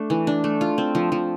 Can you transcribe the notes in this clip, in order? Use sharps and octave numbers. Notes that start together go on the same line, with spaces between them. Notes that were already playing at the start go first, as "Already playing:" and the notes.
Already playing: A3 D4
E3
D4
A3
F4
C4
F3
F3